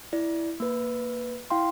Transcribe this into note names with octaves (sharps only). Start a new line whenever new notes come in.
E4 D5
A#3 B4
E4 F5 G5 C6